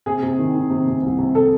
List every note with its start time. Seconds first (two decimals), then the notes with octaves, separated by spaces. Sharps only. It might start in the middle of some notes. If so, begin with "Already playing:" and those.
0.06 C3 G#4
0.23 C3
0.38 D#3
0.54 D#3
0.70 C3
0.86 C3
1.02 C2
1.19 C3
1.35 A4